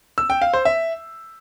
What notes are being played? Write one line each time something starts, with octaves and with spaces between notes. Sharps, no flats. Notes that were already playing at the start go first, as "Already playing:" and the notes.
E6
G5
F5
C5
E5